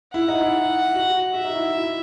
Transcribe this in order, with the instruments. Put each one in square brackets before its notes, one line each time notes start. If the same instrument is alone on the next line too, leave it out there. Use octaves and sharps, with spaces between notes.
[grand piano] E4 [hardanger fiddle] F#5
[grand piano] D#4
E4
F#4
[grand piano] F#4 [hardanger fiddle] E5
[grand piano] D#4
E4
E4